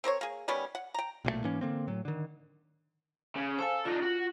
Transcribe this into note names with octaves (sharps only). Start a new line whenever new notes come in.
C4 A#4 C5 C#5
A#3 G#4
D#3 G3 B3 C#4
F#5
G5 A#5
B1 A#2 E3 A3
G#2 E3 A#3 C#4
D3 A#3 C4
A2 F#3
D3 D#3
C#3
A4 C5 F5 G#5
D4 D#4 F4
F#4